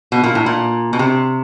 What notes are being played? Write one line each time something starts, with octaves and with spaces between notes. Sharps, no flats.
B2
A#2
A2
A#2
B2
C3